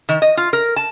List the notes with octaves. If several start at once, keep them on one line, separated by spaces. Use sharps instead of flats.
D#3
D#5
F4
A#4
A5